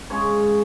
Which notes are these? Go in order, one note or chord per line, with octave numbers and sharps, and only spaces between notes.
C#3 G#3 C#5